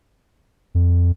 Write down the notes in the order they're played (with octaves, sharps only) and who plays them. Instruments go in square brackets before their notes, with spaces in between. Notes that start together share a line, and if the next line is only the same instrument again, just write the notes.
[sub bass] F2